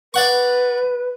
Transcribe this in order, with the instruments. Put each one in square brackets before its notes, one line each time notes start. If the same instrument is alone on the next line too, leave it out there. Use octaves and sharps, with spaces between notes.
[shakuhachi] B4 [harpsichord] D5 F#5 C#6